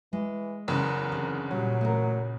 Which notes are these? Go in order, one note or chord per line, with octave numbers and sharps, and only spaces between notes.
E3 G#3
F#1 E2 C#3 A#4
D3 C4 G#4
A#2 F#3 G3
A3 F4 A#4